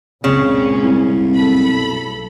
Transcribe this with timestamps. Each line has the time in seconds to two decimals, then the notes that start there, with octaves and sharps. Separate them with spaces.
0.24 C#2 F#2 A#2 C#3 A#3 C4 C#4
0.82 C2
1.34 B1 A4 B5